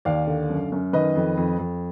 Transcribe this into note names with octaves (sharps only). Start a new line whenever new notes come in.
D#2 D5 F5
D3
F#2
F#2
D#3 B4 D#5
F2
F2
F2